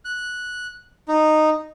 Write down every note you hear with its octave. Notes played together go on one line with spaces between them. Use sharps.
F#6
D#4